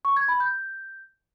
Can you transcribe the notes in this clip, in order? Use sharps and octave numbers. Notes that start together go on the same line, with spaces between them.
C#6
G#6
B5
G6